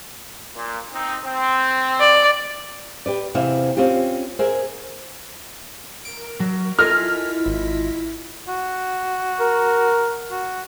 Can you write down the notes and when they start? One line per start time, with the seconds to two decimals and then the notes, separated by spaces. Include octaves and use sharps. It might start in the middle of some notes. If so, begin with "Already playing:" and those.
0.55 A#2
0.93 C4 D#4
1.24 C4
2.00 D5
3.06 G4 B4 D5
3.35 E2 C3 E3 C4 E5 F5
3.77 C4 C#4 F4 G4
4.39 G#4 A#4 C5 E5
6.05 A#4 D7
6.40 F#3
6.79 E4 F4 A4 A#4 D#5 G#5 F6 B6
7.46 G#1
8.48 F#4
9.40 A#4
10.31 F#4